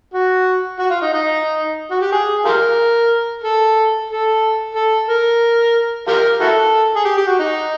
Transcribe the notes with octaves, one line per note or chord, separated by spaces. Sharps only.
F#4
F#4
F4
D#4
D#4
F#4
G4
G#4
F4 G4 A#4
A4
A4
A4
A#4
F4 G4 A#4
E4 F#4 A4
G#4
G4
G4
F#4
D#4